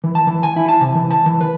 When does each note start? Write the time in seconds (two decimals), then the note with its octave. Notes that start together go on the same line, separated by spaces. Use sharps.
0.04 E3
0.15 A5
0.27 E3
0.43 G#5
0.56 E4
0.69 A5
0.81 C3
0.95 E3
1.11 A5
1.26 E3
1.41 B4